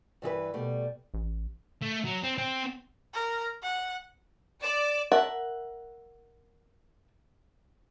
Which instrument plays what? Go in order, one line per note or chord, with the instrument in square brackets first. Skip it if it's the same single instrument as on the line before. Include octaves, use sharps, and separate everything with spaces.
[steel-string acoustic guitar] G2 E3 G#4 B4
B2 G3 A3
[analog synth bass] A1
[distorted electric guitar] A3
F#3
C4
C4
[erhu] A#4
F#5
[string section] D5 [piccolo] E7
[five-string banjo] A#4 E5 F#5 A5